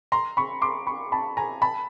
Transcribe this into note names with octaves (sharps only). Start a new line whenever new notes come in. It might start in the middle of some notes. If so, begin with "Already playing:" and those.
A#5 C6
B5 C#6
C6 D6
B5 C#6
A5 B5
G#5 A#5
A5 B5